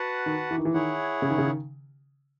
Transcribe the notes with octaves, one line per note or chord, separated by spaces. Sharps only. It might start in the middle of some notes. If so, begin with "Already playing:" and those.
Already playing: F#4 B4 F#5 A5
D#3
E3
D#3
E3
D#3 E4 G#4 C#5 F#5
C#3
D#3
C#3
D#3